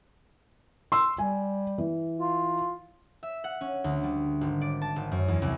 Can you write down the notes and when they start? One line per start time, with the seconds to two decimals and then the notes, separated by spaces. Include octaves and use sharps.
0.92 C6 E6
1.18 G3 G#5
1.78 E3
2.19 F4
3.23 E5
3.44 F#5
3.61 C#4
3.84 D2
4.04 G3
4.41 G#1
4.61 D5
4.82 A5
4.96 G#1
5.11 F#2
5.28 E2
5.42 C2